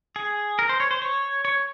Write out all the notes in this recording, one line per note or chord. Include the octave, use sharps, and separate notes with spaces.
G#4
A#4
C5
C#5
C5
C#5
C#5